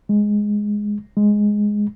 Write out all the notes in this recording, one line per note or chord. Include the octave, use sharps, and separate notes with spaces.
G#3
G#3